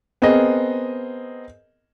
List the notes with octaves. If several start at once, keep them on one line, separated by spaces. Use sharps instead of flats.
B3 C4 G#4 A#4 D#5